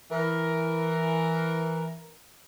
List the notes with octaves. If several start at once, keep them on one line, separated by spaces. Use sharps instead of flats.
E3 A#4